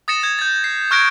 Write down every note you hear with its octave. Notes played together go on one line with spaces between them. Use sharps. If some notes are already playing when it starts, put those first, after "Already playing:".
D#6 A6 A#6 C#7 E7
G#6
G6 A6
C7
C#6 F6 F#6 G#6 A#6 D7